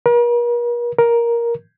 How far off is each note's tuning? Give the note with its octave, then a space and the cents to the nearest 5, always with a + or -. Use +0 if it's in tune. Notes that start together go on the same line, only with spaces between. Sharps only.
A#4 +45
A#4 +10